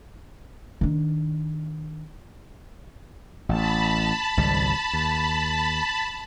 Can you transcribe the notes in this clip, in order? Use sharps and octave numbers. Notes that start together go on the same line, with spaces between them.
D#3 D4
A1 A5 B5
G#1 C#2 G3
D#2